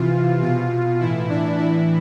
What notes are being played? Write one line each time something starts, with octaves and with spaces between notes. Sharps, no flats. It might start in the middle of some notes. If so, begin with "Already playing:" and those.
Already playing: C3 E3 F4
B2 F4
A2 E3 E4
D4
A2 E3 E4